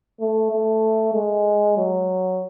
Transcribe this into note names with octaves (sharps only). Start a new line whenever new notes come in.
A3
A3
G#3
F#3